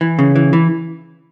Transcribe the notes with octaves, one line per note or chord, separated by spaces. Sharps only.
E3
C#3
E3
E3